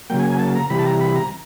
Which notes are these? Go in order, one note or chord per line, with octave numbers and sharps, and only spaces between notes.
C#3 F#3 A#3 G5
G#5
G#5
A5
A#5
C3 E3 G3 B5
A5
A#5
B5
A#5